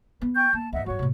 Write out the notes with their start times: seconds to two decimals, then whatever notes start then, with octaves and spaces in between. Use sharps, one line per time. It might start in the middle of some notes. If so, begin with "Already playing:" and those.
0.22 B3
0.36 G5 C#6 G6
0.53 A#3 A5
0.73 D2 G#2 D#5 E5 F#5
0.86 G2 F#3 F#4 C#5 C#6
0.99 A2 C3